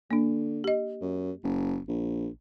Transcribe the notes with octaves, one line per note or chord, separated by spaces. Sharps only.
D3 A#3 D4
G4 D#5
F#2
F#1
A#1